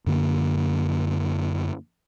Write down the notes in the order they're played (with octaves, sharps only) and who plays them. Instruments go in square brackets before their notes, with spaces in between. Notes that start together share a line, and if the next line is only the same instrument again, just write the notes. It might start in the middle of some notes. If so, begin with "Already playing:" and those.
[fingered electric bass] F#2 D3 A#3